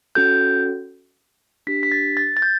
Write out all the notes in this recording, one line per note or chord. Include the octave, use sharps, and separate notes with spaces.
C#4 F#4 A4 G6
D4 G4 B6
B6
A6
A6
A6
G6